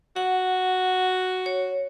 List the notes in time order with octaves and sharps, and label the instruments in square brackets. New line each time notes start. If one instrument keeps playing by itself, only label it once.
[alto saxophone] F#4 [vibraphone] F#5
[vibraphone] C#5